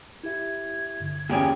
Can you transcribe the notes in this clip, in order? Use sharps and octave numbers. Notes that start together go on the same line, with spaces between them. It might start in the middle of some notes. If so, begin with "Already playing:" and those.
E4 G4 E5 G#6
G2 D3
E2 A#2 C#4 G4 G#4